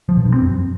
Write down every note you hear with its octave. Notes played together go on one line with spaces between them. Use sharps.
F3
B2
G2
C4
F#2